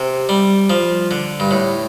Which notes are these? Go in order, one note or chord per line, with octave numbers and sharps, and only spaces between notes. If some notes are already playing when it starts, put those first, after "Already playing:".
Already playing: C3
G3
F3
D3
G2
A2